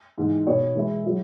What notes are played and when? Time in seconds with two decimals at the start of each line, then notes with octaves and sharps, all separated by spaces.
0.18 G#2 E3 G#3
0.46 B2 B3 F#4 C#5
0.75 E3 G#3 E4 G#4
1.04 F#3 E4 G#4